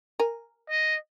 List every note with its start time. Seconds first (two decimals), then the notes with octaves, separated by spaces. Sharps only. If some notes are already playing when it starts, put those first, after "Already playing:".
0.20 A#4 G#5
0.70 D#5